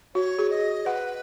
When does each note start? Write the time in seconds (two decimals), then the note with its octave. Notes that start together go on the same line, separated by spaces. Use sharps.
0.15 F#4 C#5
0.39 G#4
0.50 D#5
0.86 B4 F#5